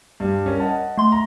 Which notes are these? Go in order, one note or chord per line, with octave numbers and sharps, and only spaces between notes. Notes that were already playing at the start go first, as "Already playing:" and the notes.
G2 G3
C#4 A#4
D#5 F#5 A5
A3 C6
A#5